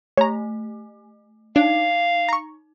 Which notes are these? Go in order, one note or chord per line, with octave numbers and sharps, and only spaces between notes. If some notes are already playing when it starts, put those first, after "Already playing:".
A3 C#5 A#5
D4 D#4 F5
A#5 C#6